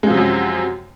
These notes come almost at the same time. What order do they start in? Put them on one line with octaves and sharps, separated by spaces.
G#3 F3 C3 F#3 F#2